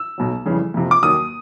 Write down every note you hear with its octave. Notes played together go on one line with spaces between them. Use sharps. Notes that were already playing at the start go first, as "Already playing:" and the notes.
Already playing: E6
B1 B2 F#3
F2 C#3 E3 G3
F2 C3 F3
D6
D#2 D#3 F#3 D#6